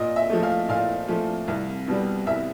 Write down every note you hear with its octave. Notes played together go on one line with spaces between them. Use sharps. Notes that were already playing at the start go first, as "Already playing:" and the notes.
Already playing: A#2 D#5
E5
F3 A3
F5
A#2 F5
F3 A3
C2
B2 G3
C2 E5